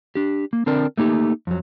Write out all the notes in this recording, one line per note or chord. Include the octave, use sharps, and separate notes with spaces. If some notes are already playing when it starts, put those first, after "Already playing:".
D4 G4
A#3
D3 C4 D4 A#4
A3 A#3 D#4 G4
F2 F#3